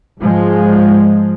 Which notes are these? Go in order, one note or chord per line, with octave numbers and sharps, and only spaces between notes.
G#2 F3 G#3